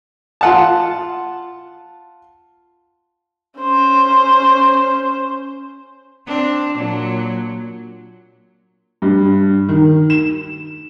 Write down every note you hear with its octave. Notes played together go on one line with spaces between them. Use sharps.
F4 F#5 A5
C#4 C5
C4 D4
A#2 F#3
G2
D#3
E7